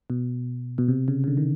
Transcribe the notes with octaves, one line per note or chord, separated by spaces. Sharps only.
B2
B2
C3
C#3
C#3
D3
D#3